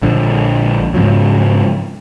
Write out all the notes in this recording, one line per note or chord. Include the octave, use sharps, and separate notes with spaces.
A#1 D3 F3
G#2 C#3 F3 F#3